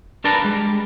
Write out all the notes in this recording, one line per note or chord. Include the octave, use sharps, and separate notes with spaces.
D4 A#4 B4 D5 A5 A#5
G3 G#3